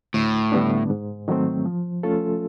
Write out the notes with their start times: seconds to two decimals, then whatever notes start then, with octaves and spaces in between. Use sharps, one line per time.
0.14 D2 A2
0.52 D3 G3 B3 D4
0.90 G#2
1.28 D#3 F#3 A3 C4
1.65 F3
2.03 A3 C#4 F4 A4